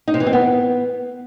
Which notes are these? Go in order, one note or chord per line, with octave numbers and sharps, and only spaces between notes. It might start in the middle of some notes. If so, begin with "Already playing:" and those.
D#4
C3
E3
C4
B3